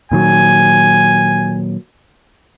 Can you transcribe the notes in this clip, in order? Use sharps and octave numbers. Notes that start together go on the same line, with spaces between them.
A#2 D#3 F#3 G#5